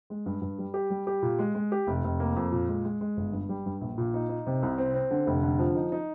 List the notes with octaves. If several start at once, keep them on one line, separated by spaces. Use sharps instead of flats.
G#3
G2
G2
G3
G4
G3
G4
A#2
G#3
G#3
G4
F1
F1
A#3
F2
A#2
G#3
G#3
G#3
G1
G2
G3
G2
A#1
A#2
D#4
D#4
C3
C2
C4
C4
D3
F1
D3
F3
D#4
D#4